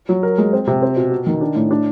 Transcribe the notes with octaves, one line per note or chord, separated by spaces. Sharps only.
F#3
A#4
G#3
C4
C3
C4
B2
F#4
D#3
D4
A2
D4